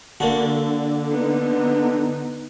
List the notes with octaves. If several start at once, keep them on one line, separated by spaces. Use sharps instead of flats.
D3 A#3 D4 F#4
B3 D#4